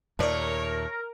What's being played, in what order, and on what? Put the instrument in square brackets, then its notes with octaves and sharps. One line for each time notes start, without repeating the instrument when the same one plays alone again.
[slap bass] D#2 A#2 [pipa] A3 D5 [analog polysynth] A#4 [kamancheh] C#5